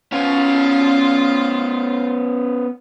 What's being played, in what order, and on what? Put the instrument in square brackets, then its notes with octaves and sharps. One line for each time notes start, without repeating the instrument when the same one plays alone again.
[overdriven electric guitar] B3 C#4 [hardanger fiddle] F4